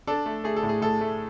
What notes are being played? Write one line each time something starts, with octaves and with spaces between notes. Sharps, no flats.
D4 A4
A3
A3 G#4
A4
A2
G#4
A2 A4
A3